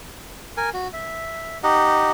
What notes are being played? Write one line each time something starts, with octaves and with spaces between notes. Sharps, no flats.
A#4 G#5
F#4
E5
D#4 G4 D#5 F#5